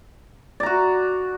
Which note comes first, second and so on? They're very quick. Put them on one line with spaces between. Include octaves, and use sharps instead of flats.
D5 A#5 F#4